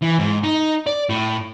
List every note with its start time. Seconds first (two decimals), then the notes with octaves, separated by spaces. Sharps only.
0.02 E3
0.19 G#2
0.44 D#4
0.87 D5
1.09 A2